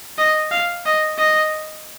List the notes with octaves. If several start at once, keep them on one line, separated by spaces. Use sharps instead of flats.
D#5
F5
D#5
D#5